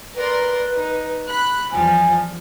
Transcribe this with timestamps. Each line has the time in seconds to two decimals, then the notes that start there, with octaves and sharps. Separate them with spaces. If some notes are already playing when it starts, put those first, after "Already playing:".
0.15 A#4 B4 D5 C6
0.75 D#4
1.29 B5 F#6
1.72 E2 F3 G3 G#5